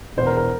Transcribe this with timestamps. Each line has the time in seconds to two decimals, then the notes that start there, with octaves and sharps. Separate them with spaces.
0.17 E1 E2 E3 C5
0.26 A#4
0.37 A#4